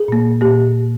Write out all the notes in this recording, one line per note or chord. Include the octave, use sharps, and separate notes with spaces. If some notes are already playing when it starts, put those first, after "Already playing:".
Already playing: G#4
A#2 A#3
A#3 G4
A#2